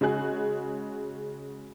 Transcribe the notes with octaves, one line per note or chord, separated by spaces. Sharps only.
C#3 G#3 F#4 G#4 F#6